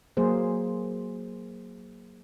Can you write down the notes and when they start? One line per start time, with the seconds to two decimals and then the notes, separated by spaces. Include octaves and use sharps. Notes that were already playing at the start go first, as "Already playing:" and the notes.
0.17 F#3 A#3 G#4 C5